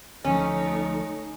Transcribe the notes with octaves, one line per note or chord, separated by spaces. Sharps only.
D2 F3 A3 C#4 D#4